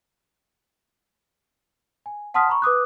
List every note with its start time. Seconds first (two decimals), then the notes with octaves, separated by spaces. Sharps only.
2.06 G#5
2.34 F#5 A5 C6 D#6 F6 B6
2.49 A#5 B5 C#6
2.62 B4 D6 D#6 F#6